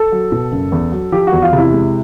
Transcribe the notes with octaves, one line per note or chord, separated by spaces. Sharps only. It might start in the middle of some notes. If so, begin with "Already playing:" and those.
Already playing: A4
F#3
B2
F#1
E2
F#3
F3 G4
F#4
E2
F4
C3 E4
G#3